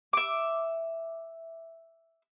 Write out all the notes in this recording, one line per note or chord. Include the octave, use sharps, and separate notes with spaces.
E5 D6